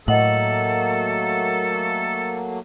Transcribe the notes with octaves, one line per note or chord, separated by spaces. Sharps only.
A2 F#3 A3 A#3 A4 D#5 F#5 F#7